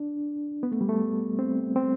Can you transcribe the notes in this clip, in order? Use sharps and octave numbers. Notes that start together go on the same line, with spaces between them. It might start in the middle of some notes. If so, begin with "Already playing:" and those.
Already playing: D4
B3
A3
G3
A3
C4
C4